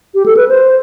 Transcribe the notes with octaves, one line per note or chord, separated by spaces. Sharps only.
G4
A4
B4
C5